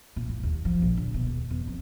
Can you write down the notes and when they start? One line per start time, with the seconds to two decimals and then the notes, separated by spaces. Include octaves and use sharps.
0.16 A#2
0.29 A2
0.43 D#2
0.65 F3
0.82 A#1
0.97 D3
1.14 B2
1.27 D#2
1.50 E2
1.67 F2